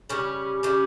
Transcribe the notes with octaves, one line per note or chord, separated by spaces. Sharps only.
C#3 G3 C#4
C#3 G3 C#4